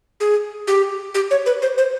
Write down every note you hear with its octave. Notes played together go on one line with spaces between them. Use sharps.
G#4
G4
G4
C#5
B4
C5
C5